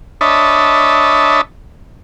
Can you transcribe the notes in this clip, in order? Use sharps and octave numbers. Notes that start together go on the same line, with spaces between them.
D4 C#5 D#5 E5 A5 B5